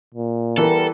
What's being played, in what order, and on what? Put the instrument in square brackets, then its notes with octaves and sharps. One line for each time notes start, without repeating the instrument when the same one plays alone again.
[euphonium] A#2
[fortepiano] E3 [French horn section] G3 B3 A#4 [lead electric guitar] A4